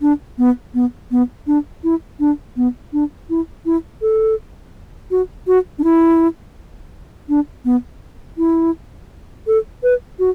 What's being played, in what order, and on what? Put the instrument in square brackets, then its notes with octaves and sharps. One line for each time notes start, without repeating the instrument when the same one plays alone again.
[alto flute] D4
B3
B3
B3
D4
E4
D4
B3
D4
E4
E4
A4
F#4
F#4
D4
E4
D4
B3
E4
A4
B4
F#4